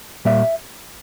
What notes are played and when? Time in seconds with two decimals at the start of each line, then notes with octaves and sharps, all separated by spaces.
0.25 A#2 G3 A#3 E5